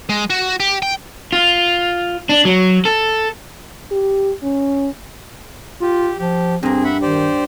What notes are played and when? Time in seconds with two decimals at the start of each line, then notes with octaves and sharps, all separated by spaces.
0.09 G#3
0.30 F#4
0.60 G4
0.82 G5
1.33 F4
2.29 D4
2.45 F#3
2.85 A4
3.91 G4
4.43 C#4
5.81 F4 G4
6.19 F3 G4
6.63 G2 A#3 C4 G#4
6.84 E5 F#5 B5
7.02 D#3 G4 C5 D5